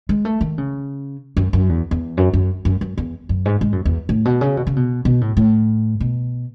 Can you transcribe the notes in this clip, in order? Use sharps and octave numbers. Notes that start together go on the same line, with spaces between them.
G#3
A3
D#3
C#3
F#2
F#2
E2
E2
F#2
F#2
F#2
F#2
E2
F#2
G#2
G#2
F#2
E2
A2
B2
C#3
B2
C#3
B2
B2
A2
A2
B2